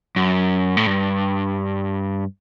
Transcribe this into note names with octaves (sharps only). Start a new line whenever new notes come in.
F#2
A2
G2